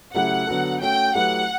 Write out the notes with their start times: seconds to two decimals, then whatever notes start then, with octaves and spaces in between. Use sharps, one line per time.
0.13 C#3 F#3 A3 E4 G4 F#5
0.47 D3 F#3 B3 F#4 A4
0.81 A3 C#4 F#4 G5
1.15 F#3 A3 E4 G4 B4 F#5